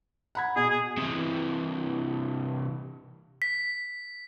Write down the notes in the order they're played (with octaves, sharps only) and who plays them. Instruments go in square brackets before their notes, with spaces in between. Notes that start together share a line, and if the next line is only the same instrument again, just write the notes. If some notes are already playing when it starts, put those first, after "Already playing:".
[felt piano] F#5 B5 G#6
[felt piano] B2 [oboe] G#4
[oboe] G#4
[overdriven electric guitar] C3 E3
[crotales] B6